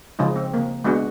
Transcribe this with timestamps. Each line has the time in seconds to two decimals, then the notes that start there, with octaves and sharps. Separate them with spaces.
0.19 C#3 F3 G#3 D#4
0.36 C4
0.54 C#3 A#3
0.84 G#3 B3 D4 F#4